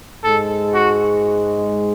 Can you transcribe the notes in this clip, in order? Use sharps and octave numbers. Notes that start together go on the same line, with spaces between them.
G#2 G#3 A4
F#4